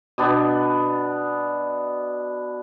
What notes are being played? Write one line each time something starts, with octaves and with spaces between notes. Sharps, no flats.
B2 B3 D4